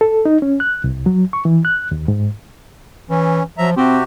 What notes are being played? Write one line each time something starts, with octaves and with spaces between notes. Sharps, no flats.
A4
D#4
C#4
F#6
C2
F#3
C#6
E3
F#6
D#2
G#2
E3 C#4
F3 F#3 E5 A#5
C3 C4 F#4 G4